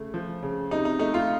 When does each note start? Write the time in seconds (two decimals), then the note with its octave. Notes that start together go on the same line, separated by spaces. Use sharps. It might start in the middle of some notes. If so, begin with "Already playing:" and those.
Already playing: C#3 A3
0.14 F3
0.43 C#3
0.71 C3 D#4
0.85 D#4
0.99 A3 D#4
1.14 F4